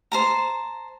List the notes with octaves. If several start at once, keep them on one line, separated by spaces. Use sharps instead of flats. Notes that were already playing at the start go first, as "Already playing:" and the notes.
C5 A5 A#5